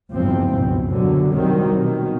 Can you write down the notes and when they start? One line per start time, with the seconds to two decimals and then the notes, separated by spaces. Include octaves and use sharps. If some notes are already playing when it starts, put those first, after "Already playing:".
0.12 F#1 E2 G#2 F3 C4
0.55 C#2 G2 B2
0.90 D#2 B2 D3 F#3
1.32 C2 D#3 F#3 G3 C4
1.79 B2 D#3